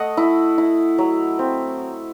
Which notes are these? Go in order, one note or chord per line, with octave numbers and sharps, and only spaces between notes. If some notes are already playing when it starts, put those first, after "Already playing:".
Already playing: A3 D#5 F#5
E4
E4
F#3
C4